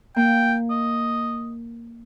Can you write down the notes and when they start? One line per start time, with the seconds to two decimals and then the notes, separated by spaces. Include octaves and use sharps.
0.16 A#3 G5
0.70 D#5